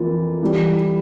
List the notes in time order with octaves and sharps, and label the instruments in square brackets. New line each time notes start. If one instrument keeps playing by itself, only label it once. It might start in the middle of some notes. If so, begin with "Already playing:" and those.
Already playing: [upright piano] F2 E3 A#3 F4
E3 G3